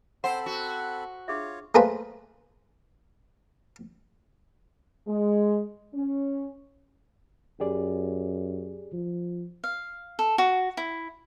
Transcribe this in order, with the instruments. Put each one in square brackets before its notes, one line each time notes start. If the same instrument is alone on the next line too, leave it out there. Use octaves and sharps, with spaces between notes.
[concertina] C4 A4 B5 [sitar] C5 [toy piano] F#5 G#5
[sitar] F#4
[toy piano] D4 G#4 E5 [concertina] F4 C#5
[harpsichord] A3 A#3 G#4 B4 C5 B5
[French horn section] G#3
C#4
[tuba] F#2 [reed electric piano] G4 G#4 D5
[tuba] F3
[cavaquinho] F5
A4
F#4
E4